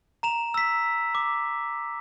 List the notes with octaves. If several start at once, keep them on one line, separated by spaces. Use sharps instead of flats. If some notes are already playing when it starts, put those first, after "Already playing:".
A#5 E7 F7
E6 B6
D6